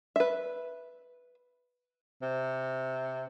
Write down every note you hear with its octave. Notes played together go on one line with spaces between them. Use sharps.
B4 E5
C3